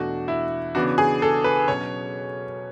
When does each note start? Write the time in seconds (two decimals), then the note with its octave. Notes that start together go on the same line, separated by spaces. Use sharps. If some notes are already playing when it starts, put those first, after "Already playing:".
Already playing: E2 B2 A3 D4 F#4
0.28 E4
0.75 C#3 E3 B3 D4 F#4
0.98 G#4
1.22 A4
1.44 B4
1.68 B2 F#3 C#4 C#5